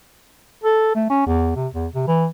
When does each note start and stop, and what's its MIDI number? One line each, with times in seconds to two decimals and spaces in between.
0.64 0.91 69
0.95 1.08 57
1.10 1.26 61
1.26 1.55 40
1.56 1.68 48
1.74 1.87 40
1.95 2.06 48
2.08 2.27 52